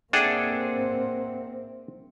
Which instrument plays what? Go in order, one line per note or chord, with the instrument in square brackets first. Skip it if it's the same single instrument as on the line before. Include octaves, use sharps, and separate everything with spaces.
[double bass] A#3 C4 [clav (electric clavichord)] D4 G#4 A4 [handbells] E5 F#5 G5